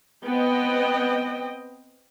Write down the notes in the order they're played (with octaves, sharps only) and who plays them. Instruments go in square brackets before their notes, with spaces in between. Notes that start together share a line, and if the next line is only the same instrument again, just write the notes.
[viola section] B3 C4 D#5 G5